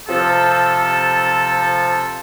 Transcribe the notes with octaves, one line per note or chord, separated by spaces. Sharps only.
C3 F3 A4